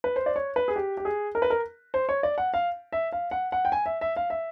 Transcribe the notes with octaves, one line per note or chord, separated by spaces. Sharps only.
B4
C5
D5
C#5
B4
G#4
G4
G4
G#4
A#4
B4
A#4
C5
C#5
D5
F#5
F5
E5
F5
F#5
F#5
G5
G#5
E5
E5
F5
E5